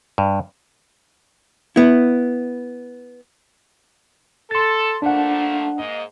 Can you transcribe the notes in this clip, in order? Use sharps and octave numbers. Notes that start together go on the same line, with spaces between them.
G2
B3 E4
A4 C6 A6
F3 A3 A#3 D4 F#5
G#2 A#3 D#5